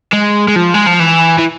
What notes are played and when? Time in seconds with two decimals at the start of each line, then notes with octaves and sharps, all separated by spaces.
0.13 G#3
0.48 G#3
0.56 F3
0.74 G#3
0.86 F3
1.00 E3
1.39 E3